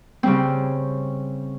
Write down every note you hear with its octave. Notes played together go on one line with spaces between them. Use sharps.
C#3 G3 C4